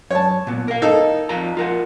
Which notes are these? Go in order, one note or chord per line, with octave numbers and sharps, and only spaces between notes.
F#2 C#5 A5
A#2 B3
A#4 F5
D#4 A4
F2 F4 A#5
F4 A#4 F#5